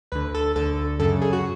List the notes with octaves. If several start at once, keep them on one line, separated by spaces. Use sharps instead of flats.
D2 D3 B4
A4
D2 D3 A4
F#2 C#3 A4
G#4
F#4